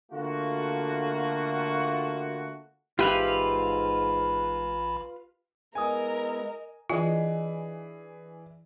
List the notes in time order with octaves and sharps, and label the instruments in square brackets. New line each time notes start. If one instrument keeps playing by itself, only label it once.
[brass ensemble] D3 A3 A#3 F4 F#4
[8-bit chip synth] A1 B5 [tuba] G#2 [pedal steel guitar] F4 B4 F5 [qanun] G4 E5
[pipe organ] G#3 B3 E4 [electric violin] A#4 [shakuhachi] D#5 [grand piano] G#5 D#6
[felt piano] E3 [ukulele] D4 D#5 G#5 [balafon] F4 [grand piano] G#4